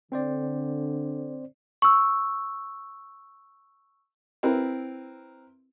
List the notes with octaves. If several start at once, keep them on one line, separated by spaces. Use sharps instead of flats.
D3 C4 C5 D5
C#6 E6
C4 E4 A#4 B4